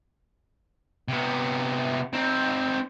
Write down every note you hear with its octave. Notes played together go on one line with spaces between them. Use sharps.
C3 B3
C4 D#4